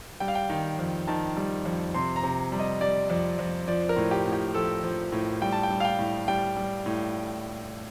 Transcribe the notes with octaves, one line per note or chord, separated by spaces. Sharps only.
G3 G5
F5
G5
D#3
F2
D#3 A5
G3
F2
C3 C6
A#5
C3
G3
D#5
G3 D5
F2
F2
F3 D5
A#4
A2
G4
A2
G4
F3 A4
F3
A2
G3 G5
A5
G5
G3
F5
G5
A2
G3 G5
G3
A2